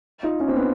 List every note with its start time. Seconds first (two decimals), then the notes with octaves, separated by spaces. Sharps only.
0.23 D#4 F4
0.40 C#4 D#4
0.48 C4 D4
0.56 B3 C#4